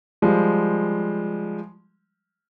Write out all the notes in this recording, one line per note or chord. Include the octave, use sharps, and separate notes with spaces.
F3 G3 G#3